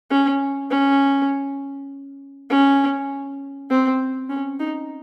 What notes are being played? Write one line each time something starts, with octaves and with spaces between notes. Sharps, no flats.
C#4
C#4
C#4
C4
C#4
D#4